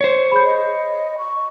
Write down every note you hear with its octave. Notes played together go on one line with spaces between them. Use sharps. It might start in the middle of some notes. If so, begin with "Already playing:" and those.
C5 C#5
G#4 B5 G6
D#5
C#6